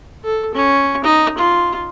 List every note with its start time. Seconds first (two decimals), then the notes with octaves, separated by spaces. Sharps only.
0.24 A4
0.55 C#4
1.04 D#4
1.38 F4